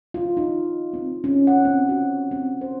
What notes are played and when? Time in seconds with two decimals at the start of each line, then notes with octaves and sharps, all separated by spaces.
0.14 F4
0.37 D#4
0.93 C4
1.24 C#4
1.47 F#5
1.65 C4
1.89 F#4
2.31 C4
2.61 C5